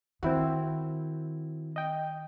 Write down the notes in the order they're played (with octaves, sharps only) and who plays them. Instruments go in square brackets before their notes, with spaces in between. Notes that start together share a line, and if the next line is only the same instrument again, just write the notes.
[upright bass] D#3 [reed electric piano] C4 E4 F#4
[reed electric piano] D#5 G5